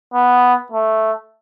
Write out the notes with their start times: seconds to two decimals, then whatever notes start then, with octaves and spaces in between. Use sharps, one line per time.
0.14 B3
0.72 A3